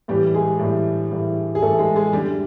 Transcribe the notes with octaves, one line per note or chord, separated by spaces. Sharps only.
A2 E3 G3 G4
G#3 G#4
A2 E3 G3
A2 E3 G3
G#4
A2 E3 G3 A3 A4
G#3 G#4
G#3 G#4
F#2 D3 G3 G4